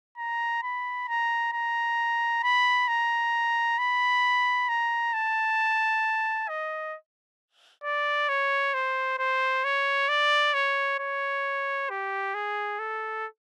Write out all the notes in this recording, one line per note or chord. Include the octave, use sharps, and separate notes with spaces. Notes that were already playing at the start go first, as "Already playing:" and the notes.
A#5
B5
A#5
A#5
B5
A#5
B5
A#5
A5
D#5
D5
C#5
C5
C5
C#5
D5
C#5
C#5
G4
G#4
A4